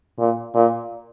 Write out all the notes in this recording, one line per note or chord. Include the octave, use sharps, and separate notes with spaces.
A#2
A#2